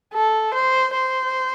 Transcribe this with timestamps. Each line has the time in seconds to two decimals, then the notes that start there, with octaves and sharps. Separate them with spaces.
0.14 A4
0.54 C5
0.94 C5